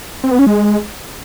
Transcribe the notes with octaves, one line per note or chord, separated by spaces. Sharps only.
C4
B3
C#4
G#3